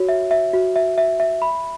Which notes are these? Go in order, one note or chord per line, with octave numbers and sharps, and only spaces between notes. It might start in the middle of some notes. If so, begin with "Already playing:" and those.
Already playing: F#4 C#5
E5
E5
F#4
E5
E5
E5
B5